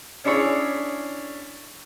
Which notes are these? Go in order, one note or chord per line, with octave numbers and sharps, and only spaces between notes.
C#4 D4 E4 G#4 C#5